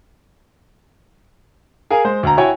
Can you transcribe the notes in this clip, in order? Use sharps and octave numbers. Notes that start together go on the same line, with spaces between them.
G#4 A#4 F5 G#5
G#3 C5
D2 A#5
E4 F#4 C#5 G5 G#5